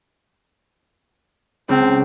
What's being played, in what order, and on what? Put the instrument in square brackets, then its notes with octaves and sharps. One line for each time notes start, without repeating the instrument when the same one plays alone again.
[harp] C#2 [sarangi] C4